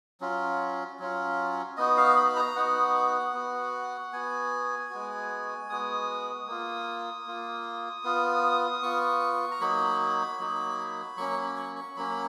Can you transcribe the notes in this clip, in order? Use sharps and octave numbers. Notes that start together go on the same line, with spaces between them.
F#3 C#4 F4
F#3 C#4 F4
B3 D#4 F#4 D#5
F5
B5
A#5
B3 D#4 F#4 F#5
B3 F#4
B3 F#4 G#5
G#3 B3 F#4
G#3 B3 F#4 D#6
A#3 F4
A#3 F4
B3 F4
B3 F4 C#6
A#5
F#3 A#3 D#4 F#4 B5
F#3 A#3 D#4 F#4
F#3 A#3 C#4 C#6
B5
C#6
C#6
F#3 A#3 C#4 B5